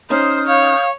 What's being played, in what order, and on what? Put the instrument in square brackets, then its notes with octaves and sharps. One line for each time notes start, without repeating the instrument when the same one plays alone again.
[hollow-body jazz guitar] C#4 D#4 [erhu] C5 [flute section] D#6 F6 G6
[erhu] C#5 [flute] F5